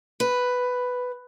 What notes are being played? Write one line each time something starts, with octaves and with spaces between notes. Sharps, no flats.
B4